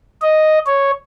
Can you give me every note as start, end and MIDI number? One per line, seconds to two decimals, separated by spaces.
0.22 0.59 75
0.67 0.91 73